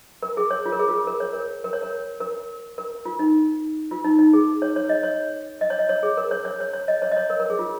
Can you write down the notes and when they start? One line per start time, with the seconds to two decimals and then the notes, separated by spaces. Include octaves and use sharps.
0.23 A#4
0.37 G#4
0.51 C#5
0.66 F4
0.72 A#4
0.79 G#4
0.89 F4
0.93 G#4
1.07 A#4
1.20 C#5
1.33 A#4
1.64 A#4
1.73 C#5
1.83 A#4
2.20 A#4
2.78 A#4
3.05 F4
3.19 D#4
3.91 F4
4.04 D#4
4.19 D#4
4.33 G#4
4.62 C#5
4.76 C#5
4.89 D#5
5.03 C#5
5.61 D#5
5.70 C#5
5.79 D#5
5.89 C#5
6.03 G#4
6.17 A#4
6.31 C#5
6.45 C#5
6.60 C#5
6.73 C#5
6.88 D#5
7.02 C#5
7.11 D#5
7.17 C#5
7.30 A#4
7.40 A#4
7.50 G#4
7.59 F4